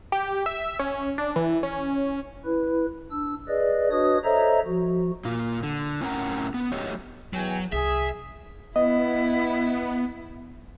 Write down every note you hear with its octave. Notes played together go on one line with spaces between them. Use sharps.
G4
E5
C#4
D4
E3
C#4
E4 B4
D4 E6
G#4 B4 D5 D#5
D4 F#4 B4 C#5 D#5 D#6
A4 C5 C#5 D#5 E5 A#5
F3 F#4
A#2 A#3 F4
D3
A2 C4 C#4 A#4 F#5 A#5
B3
F#3 A3 G4 C#5 D#5
E2 F#3 G5 G#5
C2 G#4 E5
B3 E4 D#5